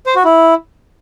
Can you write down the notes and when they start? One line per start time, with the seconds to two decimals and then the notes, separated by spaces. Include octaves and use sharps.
0.06 C5
0.15 F#4
0.25 E4